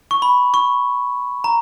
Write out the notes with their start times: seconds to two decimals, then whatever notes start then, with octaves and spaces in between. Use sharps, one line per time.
0.11 C#6
0.22 B5
0.54 C#6
1.44 A#5